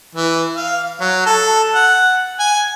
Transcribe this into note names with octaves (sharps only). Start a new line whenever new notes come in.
E3
F5
F#3
A4
F#5
G#5